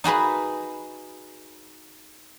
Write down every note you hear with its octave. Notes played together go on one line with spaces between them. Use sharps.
D#4 F#4 G#4 B4